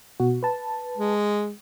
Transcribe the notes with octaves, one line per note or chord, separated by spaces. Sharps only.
B2 F#4
B4 A5
G#3